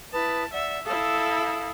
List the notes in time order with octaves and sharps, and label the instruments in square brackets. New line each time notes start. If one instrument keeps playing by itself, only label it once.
[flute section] E4 B4 D#6 [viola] A5
[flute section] D5 F#5 [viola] E5
[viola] E4 A4 [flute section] F5 D#6